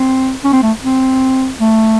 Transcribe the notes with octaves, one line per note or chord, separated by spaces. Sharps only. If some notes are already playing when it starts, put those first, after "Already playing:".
Already playing: C4
C#4
C4
A3
C4
A3